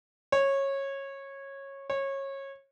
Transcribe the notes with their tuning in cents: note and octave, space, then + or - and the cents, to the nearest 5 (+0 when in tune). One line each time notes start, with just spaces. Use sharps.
C#5 -15
C#5 -20